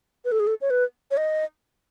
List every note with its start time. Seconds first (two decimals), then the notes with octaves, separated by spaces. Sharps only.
0.25 B4
0.32 A4
0.40 G#4
0.47 A4
0.61 C#5
0.70 B4
1.11 C#5
1.17 D#5